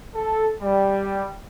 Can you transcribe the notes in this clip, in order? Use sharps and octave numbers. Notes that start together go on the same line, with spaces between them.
A4
G3